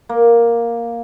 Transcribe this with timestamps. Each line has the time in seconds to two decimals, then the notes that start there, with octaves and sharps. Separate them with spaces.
0.09 A#3